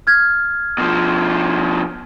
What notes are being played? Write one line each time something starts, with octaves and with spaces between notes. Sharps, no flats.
F6 G#6
B2 F3